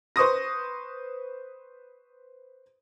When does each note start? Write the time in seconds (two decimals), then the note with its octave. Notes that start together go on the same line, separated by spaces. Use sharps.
0.16 B4 C5 C#6 D#6 A#6